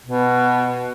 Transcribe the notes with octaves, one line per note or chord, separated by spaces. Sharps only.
B2